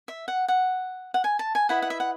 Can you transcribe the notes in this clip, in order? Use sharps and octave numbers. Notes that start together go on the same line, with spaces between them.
E5
F#5
F#5
F#5
G#5
A5
G#5
E4 B4 D#5 F#5
F#5
E5
F#5